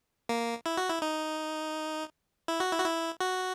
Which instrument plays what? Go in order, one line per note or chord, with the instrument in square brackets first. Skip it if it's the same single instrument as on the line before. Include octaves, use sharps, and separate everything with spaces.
[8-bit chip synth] A#3
E4
F#4
E4
D#4
E4
F#4
E4
F#4
E4
F#4